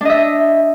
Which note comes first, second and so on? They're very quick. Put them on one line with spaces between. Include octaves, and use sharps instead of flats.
D4 D#5 E5